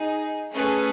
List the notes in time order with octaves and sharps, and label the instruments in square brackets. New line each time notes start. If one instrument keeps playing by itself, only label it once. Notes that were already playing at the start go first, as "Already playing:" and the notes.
Already playing: [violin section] D#4 G#4
A3 C#4 G#4 B4